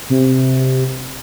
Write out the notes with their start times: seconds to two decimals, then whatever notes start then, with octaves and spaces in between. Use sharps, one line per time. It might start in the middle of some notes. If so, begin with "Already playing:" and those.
0.10 C3